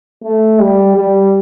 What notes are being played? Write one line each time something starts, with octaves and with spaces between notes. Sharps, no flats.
A3
G3
G3